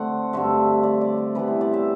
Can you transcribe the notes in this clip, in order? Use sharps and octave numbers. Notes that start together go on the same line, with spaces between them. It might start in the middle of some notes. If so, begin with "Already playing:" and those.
Already playing: D3 A3 C4 F#5
G2 D3 A3 E5
D5
D5
E5
C3 E3 B3 B4
C5
D5
E5